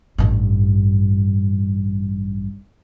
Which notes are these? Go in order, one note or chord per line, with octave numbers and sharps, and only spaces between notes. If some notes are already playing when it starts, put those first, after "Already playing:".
A1 G2